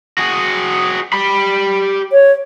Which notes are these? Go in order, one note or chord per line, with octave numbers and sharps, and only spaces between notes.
F#4 G#4
G4 B5
C#5